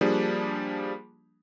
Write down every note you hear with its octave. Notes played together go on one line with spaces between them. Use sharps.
F3 G3 A#3 D4 G#4